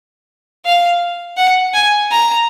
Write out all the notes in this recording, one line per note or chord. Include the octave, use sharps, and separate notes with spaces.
F5
F#5
G#5
A#5